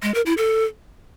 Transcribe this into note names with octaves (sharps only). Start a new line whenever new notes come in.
G#3
A#4
E4
A4